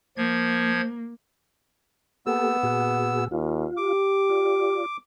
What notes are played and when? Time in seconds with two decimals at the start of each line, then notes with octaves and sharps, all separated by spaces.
0.17 F3 A#3 G#6
2.27 A#3 B3 G4 A4 E6
2.63 A#2 F#4 G#4
3.32 D#2 F4
3.77 G4 D6
4.30 F4 D5